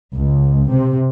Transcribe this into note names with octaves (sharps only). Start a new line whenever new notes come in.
C#2
C3